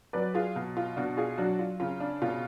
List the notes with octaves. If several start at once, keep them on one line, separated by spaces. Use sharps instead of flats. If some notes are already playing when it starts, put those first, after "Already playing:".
F#3 B4 D5
F4 G#4
B2
F4
B2 D4 F#4
F4 G#4
F#3 D4 F#4
F4
C#3 F4
D4
B2 F4